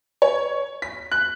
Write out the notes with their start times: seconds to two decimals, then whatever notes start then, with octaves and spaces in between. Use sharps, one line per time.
0.22 C#5
0.82 B6
1.12 F#6